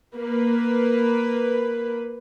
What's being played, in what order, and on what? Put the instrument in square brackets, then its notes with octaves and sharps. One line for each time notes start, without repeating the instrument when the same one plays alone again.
[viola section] A#3 B4